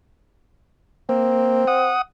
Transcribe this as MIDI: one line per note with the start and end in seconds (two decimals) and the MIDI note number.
1.09 1.65 58
1.09 1.91 60
1.67 2.02 78
1.67 2.02 87